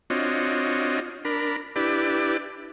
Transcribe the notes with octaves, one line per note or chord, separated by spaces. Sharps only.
C4 D4 F4 F#4 C#5 D#5
D4 A#4 B5
D4 E4 G4 B4 D5